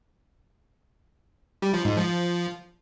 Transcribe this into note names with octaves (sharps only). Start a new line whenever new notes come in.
G3
F3
G#2
F3